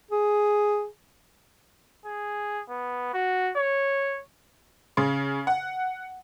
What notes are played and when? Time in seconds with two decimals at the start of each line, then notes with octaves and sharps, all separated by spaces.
0.11 G#4
2.06 G#4
2.69 B3
3.14 F#4
3.57 C#5
4.97 C#3
5.47 F#5